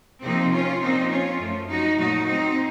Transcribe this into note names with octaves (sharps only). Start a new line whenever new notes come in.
C3 F3 A#3 C4 D#4
C#4 F4
A#2 F3 A#3 C4 D#4
C#4 F4
F#2 F3 A3
D#4 F#4
A#2 F#3 A3 D#4 F#4
C4 D#4